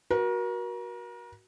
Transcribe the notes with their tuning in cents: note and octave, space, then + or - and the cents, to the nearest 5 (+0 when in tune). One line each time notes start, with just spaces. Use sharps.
F#4 +0 A#4 +35